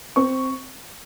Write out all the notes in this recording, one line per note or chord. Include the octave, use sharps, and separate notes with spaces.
C4 C#6